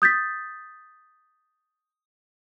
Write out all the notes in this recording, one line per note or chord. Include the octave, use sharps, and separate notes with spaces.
D#6 G6 A6 B6